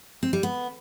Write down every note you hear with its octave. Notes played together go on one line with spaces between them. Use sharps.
C4
G3
B3